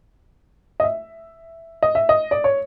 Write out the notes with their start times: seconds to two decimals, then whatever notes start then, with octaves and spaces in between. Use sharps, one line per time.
0.80 D#5
0.84 E5
1.83 D#5
1.95 E5
2.09 D#5
2.31 D5
2.44 C#5